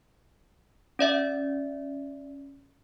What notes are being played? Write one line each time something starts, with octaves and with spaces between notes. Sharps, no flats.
C#4 D5 E5